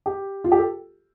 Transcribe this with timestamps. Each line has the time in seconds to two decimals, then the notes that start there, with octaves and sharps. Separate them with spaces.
0.06 G4
0.44 F4
0.52 G4
0.58 A4